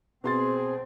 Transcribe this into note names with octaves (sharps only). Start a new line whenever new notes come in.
B2 C4 G#4 C6 A6